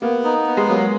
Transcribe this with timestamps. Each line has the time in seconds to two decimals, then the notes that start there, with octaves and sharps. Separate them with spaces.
0.02 A#3 B3
0.24 D#4
0.46 B3
0.57 G#3
0.68 F#3 A#3